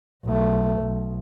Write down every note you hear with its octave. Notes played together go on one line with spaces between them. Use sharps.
B1 A3
B1